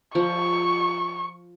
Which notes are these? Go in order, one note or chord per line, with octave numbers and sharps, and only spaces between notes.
F3 C#6